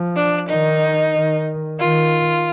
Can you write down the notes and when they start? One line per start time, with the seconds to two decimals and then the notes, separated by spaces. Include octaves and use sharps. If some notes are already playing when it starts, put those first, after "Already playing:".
Already playing: F3
0.16 D4
0.49 D#3 D#4
1.15 D#3
1.80 D#3 F4